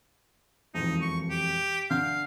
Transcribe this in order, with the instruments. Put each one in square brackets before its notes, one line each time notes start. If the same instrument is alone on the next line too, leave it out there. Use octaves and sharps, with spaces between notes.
[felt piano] E1 F2 [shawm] D#4
[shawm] C#6
G4
[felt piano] D3 G6 [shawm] F5